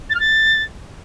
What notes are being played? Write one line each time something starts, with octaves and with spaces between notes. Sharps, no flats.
A6
F6
A6